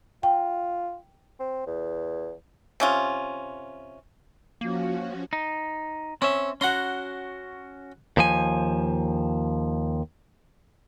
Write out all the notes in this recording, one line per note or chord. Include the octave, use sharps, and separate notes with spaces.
F4 G5
C4
E2
C3 C#4 F4
F3 A#3 C#4 F#4
D#4
C4 C#4 E5
C#4 F#4 F#5 A#5 C6
D#2 F3 G#5